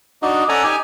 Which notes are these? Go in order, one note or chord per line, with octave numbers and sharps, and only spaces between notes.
D4 D#4 F#4 D#5
C#4 A4 D5 F#5 G#5 A#5
D#4 G4 G#5